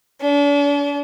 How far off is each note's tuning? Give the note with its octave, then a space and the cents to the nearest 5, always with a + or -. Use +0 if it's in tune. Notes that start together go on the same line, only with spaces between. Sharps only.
D4 -45